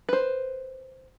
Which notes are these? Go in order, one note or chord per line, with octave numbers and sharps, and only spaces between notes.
B4 C5